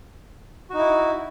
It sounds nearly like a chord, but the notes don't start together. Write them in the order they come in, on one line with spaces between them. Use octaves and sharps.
F#4 D#4 E4